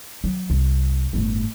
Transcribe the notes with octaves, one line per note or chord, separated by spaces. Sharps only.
F#3
C2
G1 A2